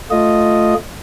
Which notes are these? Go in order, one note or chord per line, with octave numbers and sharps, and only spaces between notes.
A3 F4 D#5